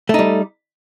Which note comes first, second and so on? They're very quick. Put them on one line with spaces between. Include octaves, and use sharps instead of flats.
A3 D#4 G3